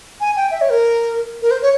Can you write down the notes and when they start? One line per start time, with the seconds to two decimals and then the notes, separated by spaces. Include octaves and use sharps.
0.20 G#5
0.36 G5
0.51 E5
0.61 C#5
0.71 A#4
1.42 A#4
1.51 C5
1.62 C#5